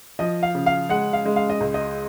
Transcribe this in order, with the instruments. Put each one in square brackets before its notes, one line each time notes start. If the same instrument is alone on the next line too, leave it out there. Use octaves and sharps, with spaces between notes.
[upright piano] F3 [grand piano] D#5
[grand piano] F5
[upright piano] C#3
[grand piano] F5
[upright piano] G#3 [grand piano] F#5
[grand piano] F5
[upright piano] G#3
[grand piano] F5
D#5
[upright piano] C#2
[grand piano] D#5